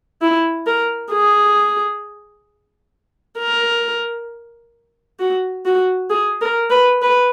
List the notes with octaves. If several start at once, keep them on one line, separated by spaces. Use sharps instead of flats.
E4
A#4
G#4
A#4
F#4
F#4
G#4
A#4
B4
B4